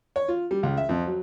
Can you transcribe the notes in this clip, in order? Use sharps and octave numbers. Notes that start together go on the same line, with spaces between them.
C#5
F4
G3
C#2
E5
F2
F#3